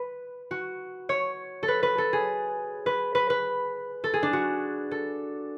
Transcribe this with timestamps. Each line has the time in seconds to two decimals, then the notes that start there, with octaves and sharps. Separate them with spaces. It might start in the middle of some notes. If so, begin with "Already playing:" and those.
Already playing: B4
0.51 F#4
1.09 C#5
1.63 A4
1.68 B4
1.83 B4
1.98 A4
2.13 G#4
2.86 B4
3.15 B4
3.30 B4
4.04 A4
4.14 G#4
4.23 D4
4.33 F#4
4.91 A4